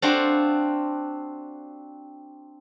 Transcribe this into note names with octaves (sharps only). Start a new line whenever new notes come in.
C4 D4 F4 F#4